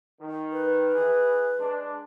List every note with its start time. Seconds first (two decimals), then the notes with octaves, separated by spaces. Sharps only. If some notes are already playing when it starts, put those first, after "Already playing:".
0.18 D#3
0.52 B4
0.94 E3 G#4
1.59 G#3 D4